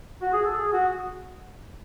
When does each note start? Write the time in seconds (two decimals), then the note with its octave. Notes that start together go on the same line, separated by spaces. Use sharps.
0.22 F#4
0.33 G#4
0.45 A4
0.56 G#4
0.73 F#4